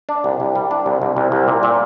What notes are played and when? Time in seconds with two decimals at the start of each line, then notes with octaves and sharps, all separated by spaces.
0.09 D4
0.24 C2
0.40 C2
0.56 G3
0.71 D4
0.86 C2
1.02 C2
1.16 C2
1.32 C2
1.48 A#2
1.63 A#2